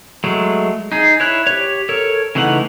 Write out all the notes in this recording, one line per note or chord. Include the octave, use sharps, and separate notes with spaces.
F#3 G#3 A3
D#4 G#4
E4 C#5 F#6
G4 C#5
A4 A#4 C#5
C#3 E3 A3 D#4 F#5